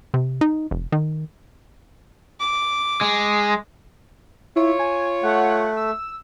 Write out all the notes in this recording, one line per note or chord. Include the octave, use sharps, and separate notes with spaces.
C3
D#4
F1
D#3
D6
G#3
E4 F4 C#5
G#5
A3 F#5
E6